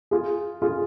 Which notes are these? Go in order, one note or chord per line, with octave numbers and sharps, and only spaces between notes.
F4 G#4
F4 G#4